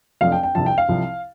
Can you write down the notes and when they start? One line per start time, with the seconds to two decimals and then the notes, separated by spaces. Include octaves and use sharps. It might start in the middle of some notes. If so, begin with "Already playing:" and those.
0.21 F1 F2 F3 F5
0.32 G5
0.43 G5
0.55 C2 C3 F3 A5
0.66 G5
0.78 F5
0.89 C2 C3 F3